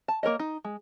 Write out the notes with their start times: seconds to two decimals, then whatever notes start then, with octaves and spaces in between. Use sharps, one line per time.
0.08 A5
0.23 A#3 A#4 C#5 D#5
0.39 D#4
0.64 G#3